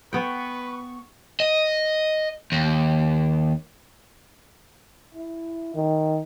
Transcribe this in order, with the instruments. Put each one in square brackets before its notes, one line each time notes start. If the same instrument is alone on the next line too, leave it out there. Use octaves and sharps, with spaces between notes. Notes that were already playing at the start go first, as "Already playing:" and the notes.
[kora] B3 G5 [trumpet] B4 [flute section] C#6
[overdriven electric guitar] D#5
D#2
[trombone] E4
D#3